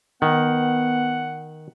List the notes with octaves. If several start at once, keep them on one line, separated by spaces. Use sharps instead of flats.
D#3 B3 F#5